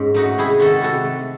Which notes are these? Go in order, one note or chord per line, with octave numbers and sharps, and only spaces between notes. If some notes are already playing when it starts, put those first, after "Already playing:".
Already playing: G#2 C#4
A3 D#4 F#4
C3 E4 G#4
D#3 F#4 A4
C3 F#4 A4
A3